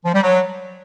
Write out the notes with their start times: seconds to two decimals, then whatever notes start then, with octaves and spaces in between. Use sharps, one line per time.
0.05 F3
0.14 G3
0.22 F#3